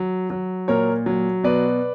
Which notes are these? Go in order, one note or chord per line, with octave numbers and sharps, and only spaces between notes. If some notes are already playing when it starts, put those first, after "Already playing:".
Already playing: F#3
F#3
A#2 A#4 C#5
F#3
B2 B4 D5